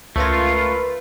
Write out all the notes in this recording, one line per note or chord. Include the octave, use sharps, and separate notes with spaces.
C#2 A3 F4 A#4 B4 G#6 A#6